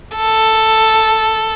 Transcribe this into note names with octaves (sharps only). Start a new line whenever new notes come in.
A4